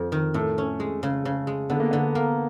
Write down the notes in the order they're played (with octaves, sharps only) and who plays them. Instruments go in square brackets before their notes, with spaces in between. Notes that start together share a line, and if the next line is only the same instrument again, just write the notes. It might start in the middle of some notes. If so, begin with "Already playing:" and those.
Already playing: [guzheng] F2
D#3
[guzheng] A2 [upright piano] A3
[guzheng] C#4
G#3
C#3
C#3
G#3
[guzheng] D3 [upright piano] B3
[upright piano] A#3
[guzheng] D3 [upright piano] B3
[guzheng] A#3